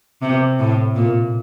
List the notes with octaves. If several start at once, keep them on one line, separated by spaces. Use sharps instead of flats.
C3
A2
A#2